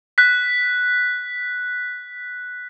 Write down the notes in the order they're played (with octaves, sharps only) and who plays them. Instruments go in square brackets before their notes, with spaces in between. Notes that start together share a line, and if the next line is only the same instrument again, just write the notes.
[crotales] F#6 B6